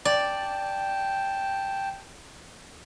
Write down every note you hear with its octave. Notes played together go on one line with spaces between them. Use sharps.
D5 G5 A5